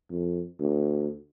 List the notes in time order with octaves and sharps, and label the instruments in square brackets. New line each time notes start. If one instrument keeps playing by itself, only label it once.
[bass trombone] F2
D2